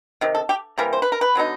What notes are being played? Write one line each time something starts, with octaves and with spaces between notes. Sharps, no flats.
C3 D#3
A4
G4
C3 E3 G3 A#3 A#4
C5
B4
A#4
B4
D3 F#3 B3 D#4